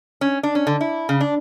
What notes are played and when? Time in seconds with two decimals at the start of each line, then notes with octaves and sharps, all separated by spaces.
0.21 C#4
0.43 D4
0.55 C#4
0.67 D3
0.81 E4
1.09 C#3
1.21 D4